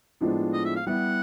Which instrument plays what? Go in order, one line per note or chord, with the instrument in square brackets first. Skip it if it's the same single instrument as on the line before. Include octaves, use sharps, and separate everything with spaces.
[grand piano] A2 F3 G#3 B3 D4
[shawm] D#5
E5
F5
[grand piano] G3 B3 E4 [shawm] F#5